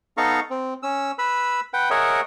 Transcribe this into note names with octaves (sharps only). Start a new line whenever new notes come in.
B3 D#4 A4 F5 A#5 C#6
C4
C#4 E6
B4 B5 E6
B4 F#5 G5
G#4 A#4 C#5 D#5 E5 F#5